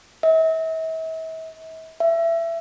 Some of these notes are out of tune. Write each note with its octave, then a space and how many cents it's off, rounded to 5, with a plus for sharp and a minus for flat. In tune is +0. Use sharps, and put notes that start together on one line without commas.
E5 -40
E5 +20